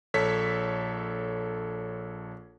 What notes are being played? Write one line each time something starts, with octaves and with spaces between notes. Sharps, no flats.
A#1 A4 C#5 B6